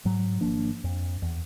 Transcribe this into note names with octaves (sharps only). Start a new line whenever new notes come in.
G#2 F#3
G#1 F3 A#3 D4
F2
E2